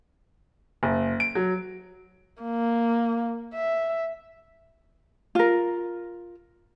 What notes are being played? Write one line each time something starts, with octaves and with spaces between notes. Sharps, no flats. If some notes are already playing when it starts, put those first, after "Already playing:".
F#1
D7
F#3
A#3
E5
F4 A#4